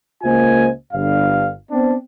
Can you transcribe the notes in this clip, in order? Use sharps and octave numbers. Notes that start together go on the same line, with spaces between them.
C#2 A#3 F4 C5 D#5 G#5
G1 G2 F5
B3 C4 D4